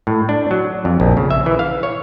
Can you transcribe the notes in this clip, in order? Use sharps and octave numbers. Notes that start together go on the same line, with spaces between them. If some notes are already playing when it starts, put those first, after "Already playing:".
A2
D4
F#3
F2
A#1
C#3
E5
E3
F5
C#5